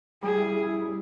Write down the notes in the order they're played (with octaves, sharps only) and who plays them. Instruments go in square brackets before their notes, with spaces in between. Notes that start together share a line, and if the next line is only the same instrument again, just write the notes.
[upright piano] G3 [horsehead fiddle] G#4
[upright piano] E4
E4
E4
G3